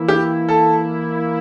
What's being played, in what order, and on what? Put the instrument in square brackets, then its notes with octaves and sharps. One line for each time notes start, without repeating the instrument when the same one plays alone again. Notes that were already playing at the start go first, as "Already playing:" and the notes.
Already playing: [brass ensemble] E3 A#3 E4
[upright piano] G4
A4